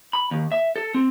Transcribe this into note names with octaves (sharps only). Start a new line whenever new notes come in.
B5
D#2
E5
A4
C4